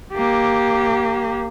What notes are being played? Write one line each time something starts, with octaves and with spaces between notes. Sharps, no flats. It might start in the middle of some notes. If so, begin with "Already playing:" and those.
A#3 G4